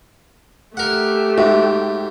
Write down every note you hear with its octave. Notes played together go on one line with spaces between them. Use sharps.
A3 G4 A#4 F#5
G#2 F#4 E5